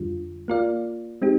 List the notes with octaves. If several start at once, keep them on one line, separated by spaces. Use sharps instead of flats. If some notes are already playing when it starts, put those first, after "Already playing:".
Already playing: F2 D3 G3 D4 F4
A#3 F4 A#4 D5 F5
G#3 C4 D#4 G4